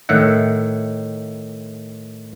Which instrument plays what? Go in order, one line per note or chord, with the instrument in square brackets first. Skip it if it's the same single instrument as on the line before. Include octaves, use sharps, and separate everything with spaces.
[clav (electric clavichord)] A2 D#3 E5 F#5